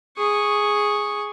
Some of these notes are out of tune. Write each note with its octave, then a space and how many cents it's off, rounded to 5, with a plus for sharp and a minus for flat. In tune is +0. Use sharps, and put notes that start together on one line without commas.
G#4 +0 C#6 +0